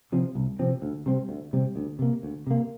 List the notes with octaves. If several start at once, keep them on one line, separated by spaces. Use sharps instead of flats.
C3 F3 C4
C2
C3 F3 C4
D2
C3 G3 C4
D2
C3 G3 C4
D2
C3 A#3
D2
C3 A#3